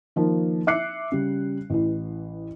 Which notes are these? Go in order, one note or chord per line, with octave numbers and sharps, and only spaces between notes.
D#3 F3 A#3
E5 D6 F#6 C7 C#7
C#3 G3
A1 E3